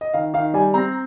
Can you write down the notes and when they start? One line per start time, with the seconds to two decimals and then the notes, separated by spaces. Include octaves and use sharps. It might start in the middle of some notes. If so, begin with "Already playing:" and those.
0.01 D#5
0.14 D#3 F5
0.34 D#3 F5
0.54 G3 G#5
0.74 C4 A#5